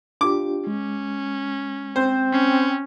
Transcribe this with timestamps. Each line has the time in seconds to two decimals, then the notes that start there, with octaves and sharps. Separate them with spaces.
0.21 D4 F4 G4 D6
0.67 G#3 C#4
1.96 C4 C5
2.32 C#4